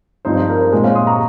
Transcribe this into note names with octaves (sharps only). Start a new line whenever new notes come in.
G2 F3 C4 D#4 C5
C5
A#4
C5
A#2 G#3 C4
C#5 F5
C6 D#6
A#5 C#6